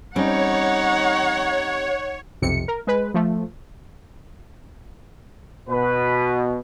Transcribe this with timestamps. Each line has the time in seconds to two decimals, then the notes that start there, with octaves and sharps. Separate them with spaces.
0.16 G3 C4 C#4 D#4 C#5 F#5
2.42 B1 F2 C3 C#7
2.68 A#4
2.87 G#3 B4
3.14 F3 A3
5.69 B2 B4